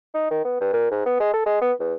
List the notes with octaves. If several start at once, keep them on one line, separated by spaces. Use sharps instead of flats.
D#4
D#3
B3
G2
A#2
G#2
B3
G#3
A4
G#3
B3
E2